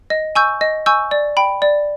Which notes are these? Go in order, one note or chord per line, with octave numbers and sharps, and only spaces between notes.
D#5
G#5 C#6 E6 G6
D#5
G#5 C#6 E6 G6
D5
G5 B5
D5